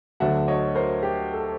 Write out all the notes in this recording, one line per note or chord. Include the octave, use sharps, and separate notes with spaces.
D2 D3 F#3 E5 F#5
C#5 D#5
A#4 C5
G4
A4